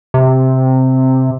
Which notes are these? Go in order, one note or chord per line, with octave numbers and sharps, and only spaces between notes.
C3